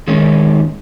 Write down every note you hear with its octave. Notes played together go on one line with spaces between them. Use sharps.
D#3 G#3 A#3 C#4 D#4